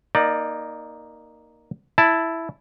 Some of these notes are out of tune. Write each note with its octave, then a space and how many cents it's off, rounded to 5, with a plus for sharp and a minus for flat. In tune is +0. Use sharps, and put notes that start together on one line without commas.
A#3 +0 D#4 +0 D5 +20
E4 +0 A5 +0